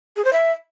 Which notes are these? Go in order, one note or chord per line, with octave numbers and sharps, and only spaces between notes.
G#4
C5
E5